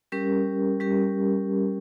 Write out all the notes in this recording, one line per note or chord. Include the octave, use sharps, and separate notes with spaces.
G3 C#4 G4 A#4
G3 C#4 G4 A#4